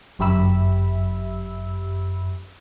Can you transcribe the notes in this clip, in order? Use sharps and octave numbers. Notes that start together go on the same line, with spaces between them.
G1 F#2 G4 E5 B5 E6